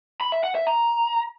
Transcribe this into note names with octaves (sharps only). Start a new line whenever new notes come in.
B5
E5
F#5
E5
A#5